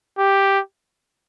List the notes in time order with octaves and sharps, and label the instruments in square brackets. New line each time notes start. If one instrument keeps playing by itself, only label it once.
[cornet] G4